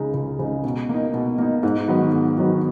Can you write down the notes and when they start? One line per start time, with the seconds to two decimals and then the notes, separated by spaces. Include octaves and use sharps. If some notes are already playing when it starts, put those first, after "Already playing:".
Already playing: C#2 C#3 G#3 D#4
0.14 C#2
0.39 C#3 G#3 D#4
0.64 B2
0.89 A#3 D#4
1.14 B2
1.38 A#3 D#4
1.63 G#2
1.88 D#3 F#3 B3
2.14 G#2
2.38 D#3 F#3 B3